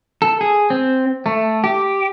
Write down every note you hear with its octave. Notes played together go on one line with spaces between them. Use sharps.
A4
G#4
C4
A3
G4